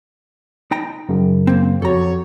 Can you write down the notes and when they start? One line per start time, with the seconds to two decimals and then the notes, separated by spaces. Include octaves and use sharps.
0.71 D#4 G5 A#5
1.09 F#2 C#3
1.47 A#3 C4
1.82 F2 F#4 G4 A4 C#5 A#5